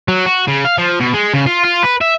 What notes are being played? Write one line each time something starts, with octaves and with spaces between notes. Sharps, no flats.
F#3
F#4
C#3
F5
F3
B2
G#3
C#3
F4
F4
B4
E5